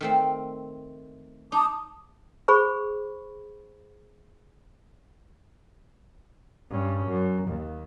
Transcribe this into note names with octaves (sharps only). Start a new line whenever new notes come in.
D#3 A3 C4
D#4 A5 D6 D#6
G#4 C5 B5 C#6
G2 C#4
F#2
D#2